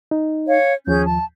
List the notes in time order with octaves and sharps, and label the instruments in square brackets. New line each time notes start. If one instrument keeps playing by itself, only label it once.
[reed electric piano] D#4
[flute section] C#5 F5
[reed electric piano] D#2 F3 [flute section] C#4 G#4 G6
[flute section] A5